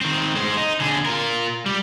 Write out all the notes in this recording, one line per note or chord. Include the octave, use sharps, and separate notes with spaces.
D#3 C4
G#3 C5
D#4
D3 G#4
F4 A#4
G3